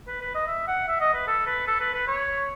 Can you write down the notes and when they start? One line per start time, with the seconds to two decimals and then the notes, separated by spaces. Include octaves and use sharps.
0.07 B4
0.21 B4
0.34 D#5
0.47 E5
0.67 F#5
0.88 E5
1.00 D#5
1.14 B4
1.27 A4
1.47 B4
1.67 A4
1.80 B4
1.93 B4
2.07 C#5